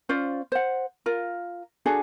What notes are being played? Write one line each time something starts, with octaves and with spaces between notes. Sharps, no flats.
C#4 F4 C5 D5
C5 F#5
F4 A#4
D4 F#4 G#4 A4